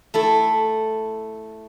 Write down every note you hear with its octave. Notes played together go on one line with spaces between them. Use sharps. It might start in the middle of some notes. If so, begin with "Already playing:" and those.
A3 E4 A4